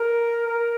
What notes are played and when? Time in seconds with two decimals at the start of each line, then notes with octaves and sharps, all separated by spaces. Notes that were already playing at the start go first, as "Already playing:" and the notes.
Already playing: A#4
0.48 A#4